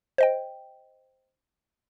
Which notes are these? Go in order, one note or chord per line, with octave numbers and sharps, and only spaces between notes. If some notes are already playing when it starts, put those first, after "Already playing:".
C5 D#5 G5